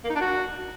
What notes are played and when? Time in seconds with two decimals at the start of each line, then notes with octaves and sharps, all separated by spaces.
0.04 A#3
0.10 D#4
0.15 D4
0.21 F#4